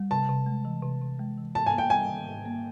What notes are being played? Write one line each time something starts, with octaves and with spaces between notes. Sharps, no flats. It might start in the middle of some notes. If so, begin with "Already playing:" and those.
Already playing: G3
C3 A5
C3
G#3
E3
C3
C3
G#3
E3
G#2 A5
G#5
A#3
G5
G3 G#5
D#3
G#2
A#3